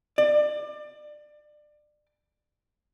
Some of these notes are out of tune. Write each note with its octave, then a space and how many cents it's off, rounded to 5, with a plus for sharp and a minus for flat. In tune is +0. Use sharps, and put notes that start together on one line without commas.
D5 +25